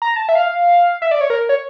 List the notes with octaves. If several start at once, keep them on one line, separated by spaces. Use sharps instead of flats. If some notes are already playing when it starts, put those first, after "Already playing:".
A#5
A5
E5
F5
E5
D5
C#5
A#4
C#5